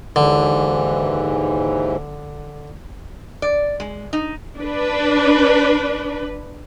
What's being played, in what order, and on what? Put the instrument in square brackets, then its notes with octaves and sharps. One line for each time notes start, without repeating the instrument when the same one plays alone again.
[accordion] D#2 G#2 E3 [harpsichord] D3
[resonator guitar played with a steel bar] D5
G#3
D#4
[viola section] D4 B4